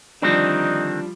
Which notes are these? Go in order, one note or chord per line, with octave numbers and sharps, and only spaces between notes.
D3 D#3 F3 G3 C4 D4 D#4